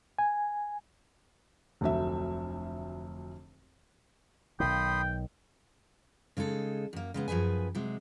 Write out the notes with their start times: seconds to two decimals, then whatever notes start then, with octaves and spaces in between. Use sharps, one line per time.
0.19 G#5
1.81 F1 D2 F#3 E5
4.60 B1 D#3 G5 B5 C6 D#6
6.37 C#3 G#3 D#4 A4
6.93 F#2 A#3
7.14 C#3 G#3 B3
7.28 F#2 F3 G#4 B4 G#5
7.75 C3 F#3 G#3